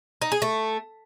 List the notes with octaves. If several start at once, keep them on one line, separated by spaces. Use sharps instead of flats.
D#4
G#4
A3